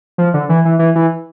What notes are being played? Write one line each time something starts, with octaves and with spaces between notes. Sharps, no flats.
F3
D3
E3
E3
E3
E3